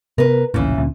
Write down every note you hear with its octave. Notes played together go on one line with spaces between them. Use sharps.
C3 B3 A#4 B4
A#1 D#2 A2 C#3 E3
D2 A#2